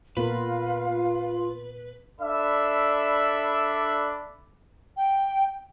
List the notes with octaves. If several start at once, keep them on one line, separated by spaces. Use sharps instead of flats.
A#2 B3 F4 A#4 B4 F5
D4 A4 D5 E5 B5
G5